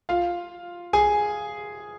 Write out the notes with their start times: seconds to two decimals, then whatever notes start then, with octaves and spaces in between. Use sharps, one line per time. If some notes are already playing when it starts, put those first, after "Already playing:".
0.09 F4 F5
0.93 G#4 G#5